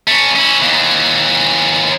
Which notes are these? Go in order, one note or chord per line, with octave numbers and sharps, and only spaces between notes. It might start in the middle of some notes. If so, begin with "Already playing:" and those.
A3 C#4
C#4 E4
D#2 E3